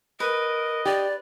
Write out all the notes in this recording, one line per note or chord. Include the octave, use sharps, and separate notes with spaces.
A#4 B4 D#5
G4 D5